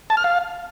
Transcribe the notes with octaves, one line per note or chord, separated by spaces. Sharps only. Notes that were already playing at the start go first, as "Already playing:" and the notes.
A5
F6
F5